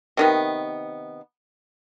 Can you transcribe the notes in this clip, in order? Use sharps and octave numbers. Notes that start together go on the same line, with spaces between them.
C3 D#3 B3